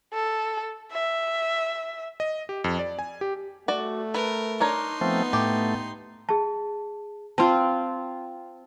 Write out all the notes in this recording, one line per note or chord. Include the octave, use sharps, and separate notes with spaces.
A4
E5
D#5
G4
F2
D5
G#5
G4
A3 F#4 D5
A#4 B4
D4 D#4 A#4 C#5 C6
F3 A3 B3 C4
A2 A3 G4
G#4 A5
C4 F4 A5 C6